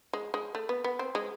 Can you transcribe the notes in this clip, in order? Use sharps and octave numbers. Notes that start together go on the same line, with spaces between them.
G#3
G#3
A3
B3
B3
C4
G#3